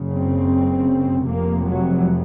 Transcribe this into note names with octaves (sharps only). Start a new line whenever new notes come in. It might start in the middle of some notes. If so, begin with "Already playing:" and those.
Already playing: F#1 F#2 C#3
C4
F1 F2 C3 A#3
F#3